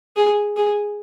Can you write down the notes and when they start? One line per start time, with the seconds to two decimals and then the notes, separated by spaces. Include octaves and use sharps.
0.17 G#4
0.57 G#4